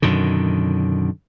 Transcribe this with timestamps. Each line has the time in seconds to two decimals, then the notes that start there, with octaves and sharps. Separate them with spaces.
0.02 F#2 B2 D3 D#3